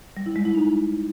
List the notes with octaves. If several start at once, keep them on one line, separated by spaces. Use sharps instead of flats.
G3
E4
G#3
E4
D#4